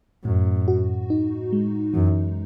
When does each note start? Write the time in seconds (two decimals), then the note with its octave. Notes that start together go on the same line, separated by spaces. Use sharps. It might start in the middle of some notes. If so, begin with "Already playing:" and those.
0.25 F#2 A2
0.68 F#4
1.10 D#4
1.52 G#3
1.94 F#2 E3